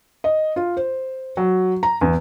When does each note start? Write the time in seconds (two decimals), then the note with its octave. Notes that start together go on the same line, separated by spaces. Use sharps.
0.24 D#5
0.56 F4
0.77 C5
1.37 F#3
1.83 A#5
2.01 E2